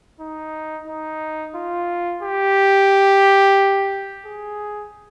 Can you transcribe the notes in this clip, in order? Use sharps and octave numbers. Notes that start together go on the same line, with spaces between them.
D#4
D#4
F4
G4
G#4